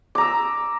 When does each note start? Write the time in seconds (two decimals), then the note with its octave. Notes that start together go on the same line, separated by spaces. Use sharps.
0.15 D6
0.18 A#5
0.21 E6